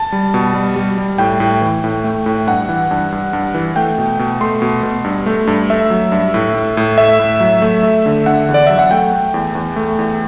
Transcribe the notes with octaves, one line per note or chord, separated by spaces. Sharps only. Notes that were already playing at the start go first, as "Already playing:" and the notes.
Already playing: A5
G3
B2
G3
G3
G3
A2 G5
A2
E3
A2
A3
A2
G2 F#5
E3
G2
G2
G2
E3
A3 G5
B2
B2
A3 C6
B2
B2
G2
A3
G2
A3 E5
F#3
G2
A2
A2
A2
A3 E5
A2
F#3
A3
A3
D3
D3 F#5
E2
D5
F#3 E5
F#5
A3 G5
A3
E2
E2
A3
E2